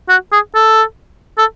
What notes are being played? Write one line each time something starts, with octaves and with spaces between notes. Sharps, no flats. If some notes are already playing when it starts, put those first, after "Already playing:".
F#4
G#4
A4
A4